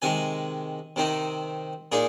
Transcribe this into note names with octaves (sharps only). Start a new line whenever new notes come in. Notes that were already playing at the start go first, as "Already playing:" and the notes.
C3 D#3 G#3 G#5
C3 D#3 C4 D#4
A#2 A#3 D#4 G#4